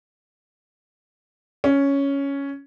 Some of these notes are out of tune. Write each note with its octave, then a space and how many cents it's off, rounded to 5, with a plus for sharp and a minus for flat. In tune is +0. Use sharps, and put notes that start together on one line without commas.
C#4 +5